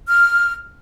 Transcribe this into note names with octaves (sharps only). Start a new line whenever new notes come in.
F6